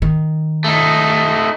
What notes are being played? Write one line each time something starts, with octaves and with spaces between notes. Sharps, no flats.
D#3
A3 D#4